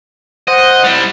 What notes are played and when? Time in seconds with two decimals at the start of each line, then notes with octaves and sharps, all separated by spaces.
0.48 C5 D#5 F#5
0.84 G3 E4